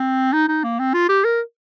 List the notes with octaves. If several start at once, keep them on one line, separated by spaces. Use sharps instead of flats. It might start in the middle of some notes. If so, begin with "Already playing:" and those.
Already playing: C4
D#4
D#4
A#3
C4
F4
G4
A#4